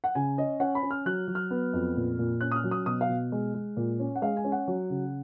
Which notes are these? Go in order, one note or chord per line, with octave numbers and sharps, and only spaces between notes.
F#5
C#3 G#5
C#4 D#5
C#4 F#5
B5
C#4
F6
F#3 F#6
F#3
F6
B3
F2
A#2
A#2
C#4 F#6
D#6
F6
F#3
D#6
B2 D#6
F5
B2
G#3
G#3
A#2
C#4
F#5
G#3 F5
G#5
C#4
F#5
F#3
C#3